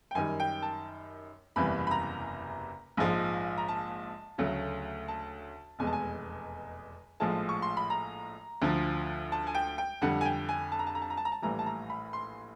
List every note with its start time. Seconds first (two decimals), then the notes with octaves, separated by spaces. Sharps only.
0.11 G5
0.15 F#2 D#3 G3 G#5
0.40 G5
0.62 A5
1.56 F#1 E2 C3 E3 G3 B5
1.87 B5
1.91 A#5
2.97 A#1 G#2 F3 G#3
3.58 A#5
3.68 A5
4.38 D2 C#3 F#3 A3
5.08 A5
5.79 F1 E2 B2 G#3 G#5
5.87 A5
5.93 G#5
7.20 A#1 A2 F3 G#3 A5
7.49 C#6
7.62 C6
7.77 B5
7.90 A#5
8.62 D2 D3 F3
9.32 A5
9.47 G#5
9.55 G5
9.78 G5
10.02 F2 D3 G3 F#5
10.21 G#5
10.25 G5
10.49 G#5
10.72 A5
10.79 A#5
10.87 A5
10.95 A#5
11.02 A5
11.10 A#5
11.17 A5
11.25 A#5
11.32 A5
11.42 A#1 A2 E3 G3 A#5
11.59 A5
11.66 A#5
11.90 B5
12.13 C6